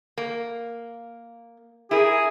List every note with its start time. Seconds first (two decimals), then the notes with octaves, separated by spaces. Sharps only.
0.18 A#3
1.91 E4 G#4 A#4